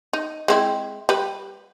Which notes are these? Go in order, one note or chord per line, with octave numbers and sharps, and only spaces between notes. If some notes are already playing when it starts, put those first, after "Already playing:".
D#4
G#3 C4 E4
G3 B4